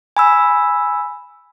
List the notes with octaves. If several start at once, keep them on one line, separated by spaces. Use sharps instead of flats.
G#5 B5 E6